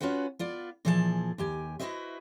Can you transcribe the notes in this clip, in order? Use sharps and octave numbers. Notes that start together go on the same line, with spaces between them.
C#4 F4 F#4 B4 F#5
B3 F4 D5
A#2 E3 F3 G#4 C5 A5
D#2 G4 G#5
E4 F#4 B4 C5 D#5 E5